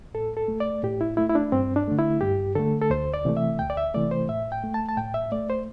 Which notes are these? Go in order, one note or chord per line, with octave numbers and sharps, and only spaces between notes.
A2 A4
A4
A3
D5
A2 G4
E4
A3 E4
E4
D4
G2 C4
D4
D3 A3
E4
G2 G4
D3 A3 A4
A4
D2 C5
D5
C3 E3 A3
E5
D2 G5
D5
E5
C3 E3 A3 D5
C5
A2 E5
G5
A3
A5
A5
A2 G5
E5
A3 D5
C5